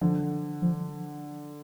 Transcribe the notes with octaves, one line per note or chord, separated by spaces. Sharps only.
D3 F3
F3